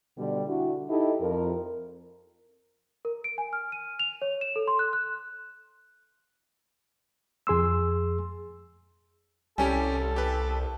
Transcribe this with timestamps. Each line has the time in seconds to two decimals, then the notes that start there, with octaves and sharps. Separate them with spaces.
0.17 B2 D3 G3
0.47 D3 D4 E4 F#4
0.89 D#4 E4 G4 A4 D#5
1.21 F2 A#4
3.05 A#4
3.24 D7
3.38 G#5
3.53 F6
3.72 D#7
3.99 F7
4.22 C#5
4.41 E7
4.56 A4
4.68 C6
4.79 F#6
4.93 F#6
7.47 F2 G#4 C6 E6
9.58 C2 G3 C#4 G4 A4 G#5
10.16 G4 B4